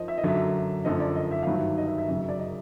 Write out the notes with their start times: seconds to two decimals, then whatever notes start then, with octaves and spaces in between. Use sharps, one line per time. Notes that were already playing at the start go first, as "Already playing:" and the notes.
Already playing: F3 D#5
0.08 E5
0.18 D#5
0.23 F#2 D3 F#3 E5
0.85 F#2 D3 F3 D#5
1.00 D5
1.16 D#5
1.31 E5
1.43 G2 D#3 F#3 F5
1.54 E5
1.78 D#5
1.88 E5
1.98 E5
2.08 F#2 C#3 F#3
2.29 D5
2.39 D#5